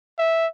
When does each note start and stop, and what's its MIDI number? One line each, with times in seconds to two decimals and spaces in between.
0.18 0.47 76